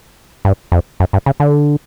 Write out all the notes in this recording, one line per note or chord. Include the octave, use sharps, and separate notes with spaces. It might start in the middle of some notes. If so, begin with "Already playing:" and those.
G2
F2
F#2
G2
C#3
D3